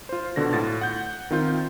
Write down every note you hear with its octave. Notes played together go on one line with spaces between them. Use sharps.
F4 C5
B2 D3 F#4 A#6
A2 F4 A6
F#5 G6
D#3 C4 F4 G6